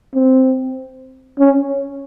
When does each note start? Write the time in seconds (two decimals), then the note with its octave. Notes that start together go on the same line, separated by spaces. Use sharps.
0.14 C4
1.39 C#4